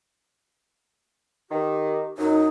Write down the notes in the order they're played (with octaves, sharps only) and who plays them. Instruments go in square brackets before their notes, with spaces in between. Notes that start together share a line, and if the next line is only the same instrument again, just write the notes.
[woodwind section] D#3 [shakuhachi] G4
[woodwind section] F#2 F#3 [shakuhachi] D#4